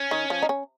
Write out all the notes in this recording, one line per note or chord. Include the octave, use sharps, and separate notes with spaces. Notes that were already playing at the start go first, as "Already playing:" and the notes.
Already playing: C#4
D#3
F3
D#4
C#4